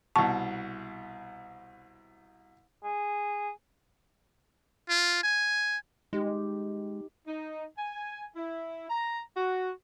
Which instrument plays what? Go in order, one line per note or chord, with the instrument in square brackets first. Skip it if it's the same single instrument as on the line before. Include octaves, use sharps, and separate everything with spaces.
[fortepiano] C2 B2 [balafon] A5 C#6
[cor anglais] G#4
[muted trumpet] F4
G#5
[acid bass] G#3 [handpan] D#4 G4
[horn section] D#4
G#5
E4
A#5
F#4